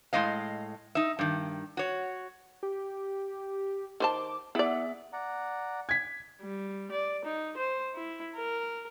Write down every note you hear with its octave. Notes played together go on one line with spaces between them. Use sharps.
A2 G#3 C#4 D#5 F5
D#4 E5
G2 D#3
F#4 C#5
G4
D#3 C5 A5 D6
B3 E4 G#4 D5 E5 F#5
D5 F#5 A#5
G#6 B6
G3
D5
D#4
C5
E4
A#4